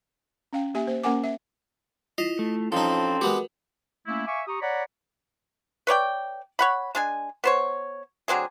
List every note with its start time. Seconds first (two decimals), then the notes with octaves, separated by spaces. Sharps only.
0.53 C#4 F5 G5
0.74 A#3 G4 E5 G#5
0.87 A#3 C5
1.04 A#3 C#4 A#4 F#5 G#5 D6
1.24 E5
2.18 E4 F4 D#5
2.39 A3
2.72 F3 C4 C#4 D#4 A4
3.21 G#3 B3 F#4 G4 A#4 B4
4.07 A3 A#3 C#4 E4
4.26 E5 F5 G#5 C#6 D6
4.47 G4 A#5 C#6 D#6
4.61 C#5 D5 F#5 A#5 B5
5.87 B4 C#5 D5 G5
6.59 C#5 F#5 B5
6.95 G#3 D4 G#5
7.44 B3 C5 C#5
8.28 D3 F#3 C4 G#4